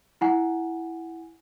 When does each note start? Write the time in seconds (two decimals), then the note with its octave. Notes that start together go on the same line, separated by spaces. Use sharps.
0.21 E4 F#5 G#5